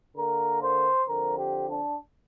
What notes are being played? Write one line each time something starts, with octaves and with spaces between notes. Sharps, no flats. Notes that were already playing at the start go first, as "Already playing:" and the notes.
D3 A#3 A#4
C5
D3 F3 C4 A#4
G4
D4